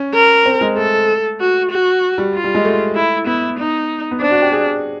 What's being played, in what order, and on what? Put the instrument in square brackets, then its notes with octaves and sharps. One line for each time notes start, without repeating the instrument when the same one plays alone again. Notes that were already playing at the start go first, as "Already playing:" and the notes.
Already playing: [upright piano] C#4
[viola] A#4
[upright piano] C4
G#3
[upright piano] A3 [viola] A4
[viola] F#4
F#4
[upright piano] G3
[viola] F4
[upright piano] G3
G#3
A3
[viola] E4
[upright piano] B3 [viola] E4
[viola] D#4
[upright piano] B3
[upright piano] C4 [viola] D4
[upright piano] F#4
G4
G#4